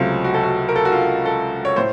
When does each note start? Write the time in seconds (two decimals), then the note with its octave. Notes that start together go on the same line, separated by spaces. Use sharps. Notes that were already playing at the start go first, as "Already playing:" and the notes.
Already playing: C#2 C3 F#3 A3 C4 F4
0.24 F#4
0.34 A4
0.43 F#4
0.69 A#4
0.76 A4
0.85 F#4
0.92 F4
1.25 A4
1.65 C#5
1.76 A2 C5